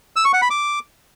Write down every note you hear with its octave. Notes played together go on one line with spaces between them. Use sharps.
E6
C#6
F#5
B5
D6